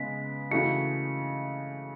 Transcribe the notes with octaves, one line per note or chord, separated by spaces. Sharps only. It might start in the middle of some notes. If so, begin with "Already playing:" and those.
Already playing: C#3 G#3 B3 B6
C#3 E3 A3 D#4 F#4 C#7